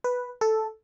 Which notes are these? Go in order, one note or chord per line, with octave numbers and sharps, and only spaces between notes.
B4
A4